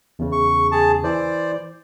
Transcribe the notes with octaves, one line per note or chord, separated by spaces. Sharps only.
E2 C#3
C#6
G#4 A5
E3 C5 D5